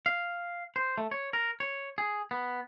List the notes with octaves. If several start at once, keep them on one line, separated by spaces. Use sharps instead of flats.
F5
C5
A3
C#5
A#4
C#5
G#4
B3